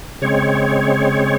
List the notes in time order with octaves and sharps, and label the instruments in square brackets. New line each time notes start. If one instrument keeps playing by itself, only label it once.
[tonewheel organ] C#3 G#3 C4 C#5